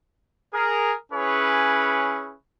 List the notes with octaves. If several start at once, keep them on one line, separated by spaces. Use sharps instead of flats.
G#4 A#4
C#4 E4 G#4 B4 C#5